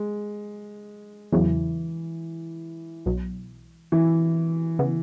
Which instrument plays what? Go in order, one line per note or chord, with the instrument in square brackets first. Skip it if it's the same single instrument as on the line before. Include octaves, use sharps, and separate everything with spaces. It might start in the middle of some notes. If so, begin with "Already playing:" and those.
Already playing: [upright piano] G#3
[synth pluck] E2 C#3 F#3 [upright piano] E3
[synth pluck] B1 B2 F#3
[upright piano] E3
[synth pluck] C#3 E3 B3